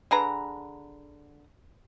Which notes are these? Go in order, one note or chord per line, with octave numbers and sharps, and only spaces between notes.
D3 G#4 B4 A#5